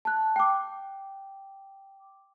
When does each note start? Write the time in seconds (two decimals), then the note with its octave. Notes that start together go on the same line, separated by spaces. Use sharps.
0.05 A5 F#6
0.36 G5 D6